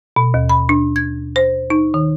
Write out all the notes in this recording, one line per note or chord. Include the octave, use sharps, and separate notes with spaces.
B2
D#2
B5
D4
G#6
C5
D#4
D#3